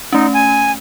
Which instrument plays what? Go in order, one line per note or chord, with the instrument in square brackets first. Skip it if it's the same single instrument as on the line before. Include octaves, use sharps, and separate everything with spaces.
[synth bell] A3 C#4 [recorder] D#4
[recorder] G#5